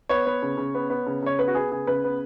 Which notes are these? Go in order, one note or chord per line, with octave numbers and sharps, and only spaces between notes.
B3 C#5
B3
C#3
C#3
B3
B3
C#3
C#3 C#5
B3 B4
F#4
B3 G#4
C#3 G#4
C#3 B4
B3